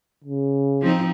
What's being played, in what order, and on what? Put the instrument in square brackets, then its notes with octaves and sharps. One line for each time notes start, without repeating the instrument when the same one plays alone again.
[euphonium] C#3
[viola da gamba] F3 C4 D#4